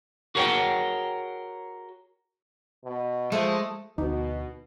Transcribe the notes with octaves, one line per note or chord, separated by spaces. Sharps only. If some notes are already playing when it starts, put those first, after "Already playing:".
F#4 G#4 A#4 C#5 F#5 G5
B2
F3 G#3 A3
D2 B2 D#4